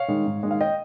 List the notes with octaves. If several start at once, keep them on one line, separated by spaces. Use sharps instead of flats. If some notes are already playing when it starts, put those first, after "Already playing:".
Already playing: C#5 F5
D#3 G#3
G#2
D#3 G#3
F5
D#5 G5